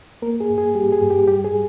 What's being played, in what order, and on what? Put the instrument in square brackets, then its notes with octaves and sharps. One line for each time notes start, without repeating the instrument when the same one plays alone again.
[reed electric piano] A#3 A#4
G#4
G2
G#4
G3 G4
G#4
G2
G4
G3 G4
G#4